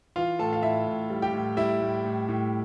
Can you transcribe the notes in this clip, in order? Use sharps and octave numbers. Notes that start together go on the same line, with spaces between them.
E3 F4 F5
A2 A4 A5
F5
A2 E4 E5
A2
G3
G4 G5
A2
G3 E4 E5
A2
A2
A2